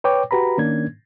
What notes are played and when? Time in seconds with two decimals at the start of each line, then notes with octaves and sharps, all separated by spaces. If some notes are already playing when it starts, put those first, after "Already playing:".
0.04 B4 C#5 G5 D6
0.31 F#4 G4 B4 A#5 B5
0.58 D#3 A#3 C#4 D4 G#6